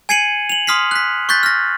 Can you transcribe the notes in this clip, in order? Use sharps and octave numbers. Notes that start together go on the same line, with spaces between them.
G#5 G#6 C7 C#7 D#7 F#7
F7 F#7
C6 D#6 F6 B6 C7
F#6 B6
C#6 F#6 G6 A6 B6
F6 A#6